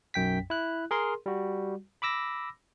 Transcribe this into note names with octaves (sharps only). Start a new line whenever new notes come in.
B1 F#2 G5 B6
E4 F#6
G#4 A#4 C6
G3 F#4
B5 D6 E6 A#6